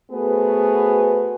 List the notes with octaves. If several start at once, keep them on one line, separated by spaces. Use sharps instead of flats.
A3 B3 F#4 G#4 B4 C5